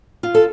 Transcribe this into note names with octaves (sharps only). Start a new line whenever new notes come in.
F4
A4